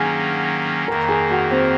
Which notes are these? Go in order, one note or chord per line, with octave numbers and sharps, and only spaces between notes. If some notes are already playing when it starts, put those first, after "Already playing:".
Already playing: D#3 F#3 A#3 C#4 G#4 F#5 G#5 A#5
F2 D#3 A#3 A#4 A#5
G#4 G#5
F#4 F#5
C4 C5